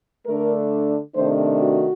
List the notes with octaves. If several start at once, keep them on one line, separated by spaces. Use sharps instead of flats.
D3 A3 D4 A#4
C3 D#3 A3 D4 C5
F#4